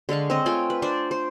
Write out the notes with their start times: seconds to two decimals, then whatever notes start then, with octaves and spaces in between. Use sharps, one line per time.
0.09 D3 G#3 F5 C#6
0.30 C4 C#5 D#5
0.46 A3 F4 G5 G#5
0.70 B4
0.82 D4 C5 D5
1.11 C5